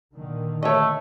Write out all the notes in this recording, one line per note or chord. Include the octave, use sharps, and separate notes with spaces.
A#2 D3 D#3
A3 C#5 D#5